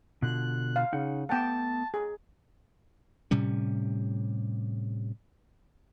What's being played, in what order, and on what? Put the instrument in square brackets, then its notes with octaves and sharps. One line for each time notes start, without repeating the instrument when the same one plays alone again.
[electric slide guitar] B2 D3 F4 [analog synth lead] F#6
[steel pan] F5
[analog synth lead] C#3 [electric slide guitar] D#4 F#5
[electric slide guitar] A3 B3 [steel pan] F#5 G5 [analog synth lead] A5
[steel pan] G#4
[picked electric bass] A2 C3 G3 C#4